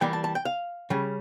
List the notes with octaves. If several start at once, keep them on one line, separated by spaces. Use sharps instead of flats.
E3 G3 A#3 G5
A5
A5
G5
F5
C#3 G3 C#4